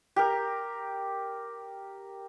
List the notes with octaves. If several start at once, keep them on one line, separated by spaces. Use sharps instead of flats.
G4 A#4